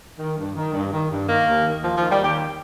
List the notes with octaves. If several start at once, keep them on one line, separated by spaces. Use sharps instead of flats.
D#3
G2
D#3
G2
D#3
G2
D#3 A#3
D#2
D#3
D#2 F3
D#3 F3
G3
D#2 G4
D#3